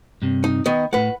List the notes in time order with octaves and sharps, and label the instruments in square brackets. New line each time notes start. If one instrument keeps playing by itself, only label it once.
[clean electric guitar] G2 C3
[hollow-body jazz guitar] D#4
[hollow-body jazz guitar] D#3 B3 [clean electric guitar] D#5
[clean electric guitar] A2 A3 [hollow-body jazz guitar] B4 F#5